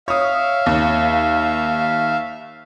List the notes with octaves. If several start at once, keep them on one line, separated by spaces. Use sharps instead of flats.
C#5 E5 F5 D#6
D#2